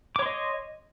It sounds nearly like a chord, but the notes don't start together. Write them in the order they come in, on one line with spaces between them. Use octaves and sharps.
D6 C#5 C6 D#5